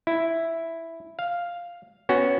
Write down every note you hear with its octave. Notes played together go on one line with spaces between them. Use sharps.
E4
F5
B3 C#4 F#4